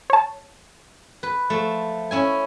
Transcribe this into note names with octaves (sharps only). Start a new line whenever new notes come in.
C#5 A5
B4
F3 A3
C#4 E4 G#5